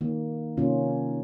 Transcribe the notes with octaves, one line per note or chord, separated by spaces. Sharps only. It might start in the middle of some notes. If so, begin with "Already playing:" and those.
D#3 A#3
C3 D#3 A#3 C#4 F4